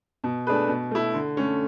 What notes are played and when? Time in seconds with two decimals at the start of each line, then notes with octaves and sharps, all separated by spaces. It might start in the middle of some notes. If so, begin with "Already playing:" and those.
0.24 B2
0.47 A3 D4 G#4 B4
0.68 B2
0.91 A3 E4
1.14 D3
1.37 A3 C#4